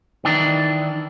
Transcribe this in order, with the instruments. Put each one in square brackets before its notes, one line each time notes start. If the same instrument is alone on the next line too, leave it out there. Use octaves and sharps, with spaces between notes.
[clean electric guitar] D#3 E3 D4